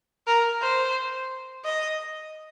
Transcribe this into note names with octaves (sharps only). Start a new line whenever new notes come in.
A#4
C5
D#5